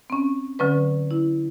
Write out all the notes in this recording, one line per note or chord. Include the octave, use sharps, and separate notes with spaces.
C4 C#4
D3 F#3 C#4 B4
E4